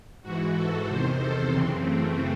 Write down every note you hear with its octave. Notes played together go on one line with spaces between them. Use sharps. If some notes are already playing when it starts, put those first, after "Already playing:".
G#2 E3 F#4
A4
E2 C3 D#3 C5
A4
F#2 C#3 E3 C4
A3